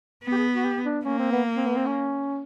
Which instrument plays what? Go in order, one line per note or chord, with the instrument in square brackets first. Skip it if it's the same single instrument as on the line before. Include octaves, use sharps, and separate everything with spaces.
[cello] B3
[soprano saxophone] G4
G#4
F#4
G4
D4
[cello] A#3 [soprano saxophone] C#4
[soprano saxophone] C4
B3
C4
B3
C4
C#4